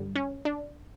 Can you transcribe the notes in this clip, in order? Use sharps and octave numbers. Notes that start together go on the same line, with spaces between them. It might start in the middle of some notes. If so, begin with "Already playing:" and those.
Already playing: G2 D3 G3
C#4
D4